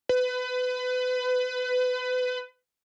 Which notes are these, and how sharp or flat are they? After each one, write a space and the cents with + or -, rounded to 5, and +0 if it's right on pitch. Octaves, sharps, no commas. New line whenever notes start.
B4 +30